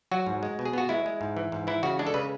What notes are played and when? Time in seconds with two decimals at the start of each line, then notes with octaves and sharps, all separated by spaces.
0.11 F#3 F#4
0.27 G#2
0.43 G#3
0.59 B2
0.65 G#4
0.73 B3 F#4
0.89 G#3 E4
1.06 G#3
1.21 G#2
1.37 E3
1.52 G#2
1.67 E3 E4
1.83 C#3 F#4
1.99 G#3 D4
2.07 A4
2.14 C#3 B4